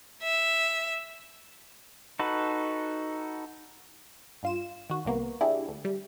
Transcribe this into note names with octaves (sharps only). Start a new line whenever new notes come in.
E5
D#4 F#4 A4 B4
G2 F4 E7
D#3 F#4
C2 C3 A#3 B3
D4 E4 G4 G#4
D2
G3